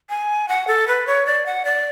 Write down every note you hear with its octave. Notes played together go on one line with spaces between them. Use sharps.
G#5
F#5
A4
B4
C#5
D5
F#5
D5